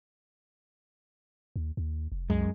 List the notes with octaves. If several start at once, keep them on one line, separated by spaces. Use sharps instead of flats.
D#2
D#2
F1
C2 F#2 G#3